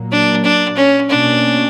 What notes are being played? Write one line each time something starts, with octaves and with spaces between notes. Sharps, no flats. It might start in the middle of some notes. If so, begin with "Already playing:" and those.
Already playing: A#2 F#3 A#3
D4
D4
C#4
B2 A#3 C#4 D4